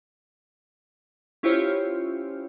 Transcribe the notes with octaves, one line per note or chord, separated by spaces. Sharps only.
C#4 E4 F4 G4 C5 C#5